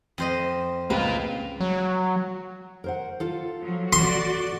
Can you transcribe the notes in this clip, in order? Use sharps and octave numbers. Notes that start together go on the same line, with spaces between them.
F2 C5 D#5
C#2 A#3 F4 B4
F#3
A#4 C5 F#5
F4 A4
F3 F#3
F#4 D5 C6